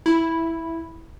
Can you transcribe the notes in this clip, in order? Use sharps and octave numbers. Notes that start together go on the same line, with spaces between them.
E4